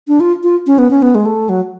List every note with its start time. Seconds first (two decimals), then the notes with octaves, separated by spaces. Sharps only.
0.08 D4
0.20 F4
0.43 F4
0.67 C#4
0.78 B3
0.90 C#4
1.02 B3
1.15 G#3
1.26 A3
1.49 F#3